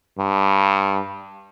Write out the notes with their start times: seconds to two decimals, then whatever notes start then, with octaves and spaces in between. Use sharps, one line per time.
0.18 G2